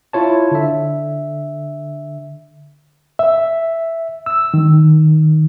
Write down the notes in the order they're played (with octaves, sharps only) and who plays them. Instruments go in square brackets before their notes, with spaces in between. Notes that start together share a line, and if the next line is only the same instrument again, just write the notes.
[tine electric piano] E4 F4 C#5 A5
D3 E5
[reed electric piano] E5
E6
D#3